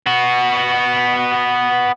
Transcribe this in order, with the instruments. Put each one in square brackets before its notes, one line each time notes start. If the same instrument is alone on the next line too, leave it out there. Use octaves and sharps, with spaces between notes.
[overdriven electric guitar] B3 F#4